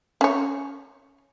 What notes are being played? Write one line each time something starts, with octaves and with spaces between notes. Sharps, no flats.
C#4 C#5